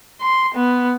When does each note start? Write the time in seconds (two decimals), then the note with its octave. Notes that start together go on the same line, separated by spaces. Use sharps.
0.21 C6
0.54 B3